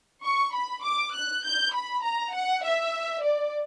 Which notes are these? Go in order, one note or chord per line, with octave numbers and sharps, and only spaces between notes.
C#6
B5
D6
F#6
G6
B5
A#5
F#5
E5
D5